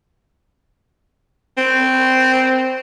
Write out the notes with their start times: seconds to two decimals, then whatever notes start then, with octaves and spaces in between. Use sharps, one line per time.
1.58 C4